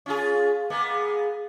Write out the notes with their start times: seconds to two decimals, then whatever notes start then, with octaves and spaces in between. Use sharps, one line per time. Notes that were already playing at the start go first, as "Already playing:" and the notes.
0.06 C#4 F4 G#4
0.70 G#3 A#3 B3